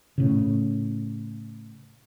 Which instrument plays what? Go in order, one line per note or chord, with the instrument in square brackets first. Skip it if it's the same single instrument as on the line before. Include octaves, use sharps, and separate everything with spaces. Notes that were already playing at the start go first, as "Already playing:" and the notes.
[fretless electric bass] A2 C#3